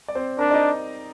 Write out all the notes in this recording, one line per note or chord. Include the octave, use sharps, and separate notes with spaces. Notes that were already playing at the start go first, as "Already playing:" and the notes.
D5
C4 C5
D4 A#4 A#5
D5
D#4 D#5